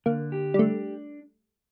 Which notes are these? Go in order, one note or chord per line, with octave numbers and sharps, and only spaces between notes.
D3 A#3
G4
G3
A3 D4